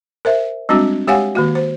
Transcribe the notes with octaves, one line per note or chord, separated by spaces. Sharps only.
A#4 C5 E5
G3 G#3 C4 D4 F#4
G#3 G4 C#5 F5 F#5 G#5
D#3 A#3 F#4
C5